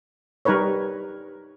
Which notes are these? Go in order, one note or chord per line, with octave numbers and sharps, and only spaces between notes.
G3 D#4 A#4 B4 C#5